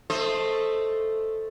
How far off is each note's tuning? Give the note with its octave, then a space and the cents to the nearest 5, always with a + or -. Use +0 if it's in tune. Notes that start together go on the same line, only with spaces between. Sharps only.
A3 +0 C5 +0 D#5 +0